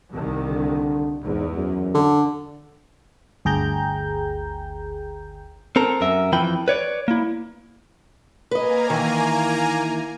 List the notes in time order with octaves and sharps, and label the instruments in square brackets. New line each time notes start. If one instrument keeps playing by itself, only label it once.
[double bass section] C2 D#3
[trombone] D3
[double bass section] E2 [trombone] G#2
[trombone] F#2
[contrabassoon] D3
[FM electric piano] G1 D2 G#4 G5 A#5 G6
[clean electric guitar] C4 A4 A#4
F#2 A#4 E5
F2 E3 F3 G5 B5
B4 C#5 D5
A#3 E4
[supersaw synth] A#3 G#5 A#5 [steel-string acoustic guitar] B4 D#5
[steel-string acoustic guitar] D#3 E3